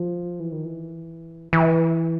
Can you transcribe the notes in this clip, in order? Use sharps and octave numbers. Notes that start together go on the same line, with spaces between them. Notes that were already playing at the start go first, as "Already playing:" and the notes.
Already playing: F3
E3
D#3
E3
E3